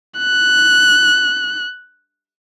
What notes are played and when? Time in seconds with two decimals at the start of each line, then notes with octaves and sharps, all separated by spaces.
0.19 F#6